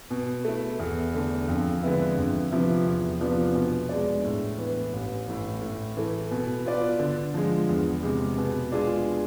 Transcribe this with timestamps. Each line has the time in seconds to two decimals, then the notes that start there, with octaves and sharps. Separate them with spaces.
0.11 B2
0.45 A3 E4
0.80 E2
1.14 D3 A3
1.48 F2
1.83 D3 G#3 B3 E4
2.17 F2
2.51 C3 F3 B3 E4
2.86 E2
3.20 C3 F3 B3 D4
3.55 B2
3.89 G#3 D4 G#4 D5
4.24 A2
4.58 E3 B3
4.93 A1
5.27 A2 E3
5.62 A2
5.97 E3 A3
6.31 B2
6.66 B3 F4 B4 D5
6.99 D3
7.34 F3 G#3
7.69 E2
8.03 C3 G#3
8.38 B2
8.72 G#3 D4 F4 G#4